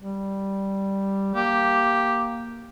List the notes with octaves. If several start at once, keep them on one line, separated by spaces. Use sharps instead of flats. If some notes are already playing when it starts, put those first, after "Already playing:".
G3
A#3 G4